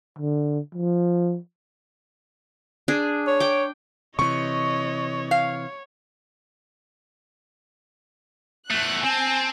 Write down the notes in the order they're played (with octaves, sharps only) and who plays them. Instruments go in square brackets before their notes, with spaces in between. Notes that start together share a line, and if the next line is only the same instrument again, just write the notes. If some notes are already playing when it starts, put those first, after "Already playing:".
[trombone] D3
F3
[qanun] D4 G#4
[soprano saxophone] C#5
[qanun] G5 D6
[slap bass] C3 E3 [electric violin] C#5 D#5 [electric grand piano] C#6
[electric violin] C#5 [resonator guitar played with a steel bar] F5
[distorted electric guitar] E2 A3 [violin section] F#6
[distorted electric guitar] C4 [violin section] G#5 A5